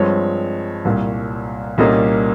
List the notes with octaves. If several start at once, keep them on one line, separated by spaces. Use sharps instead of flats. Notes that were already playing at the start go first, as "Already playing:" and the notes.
Already playing: G2 F3 G#3 C4 C#5
C2 A#2 G3
C2 A#2 G3 A#3 C#4 D#5